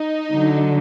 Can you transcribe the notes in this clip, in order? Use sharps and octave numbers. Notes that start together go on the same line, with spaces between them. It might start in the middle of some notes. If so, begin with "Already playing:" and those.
Already playing: D#4
D3 F#3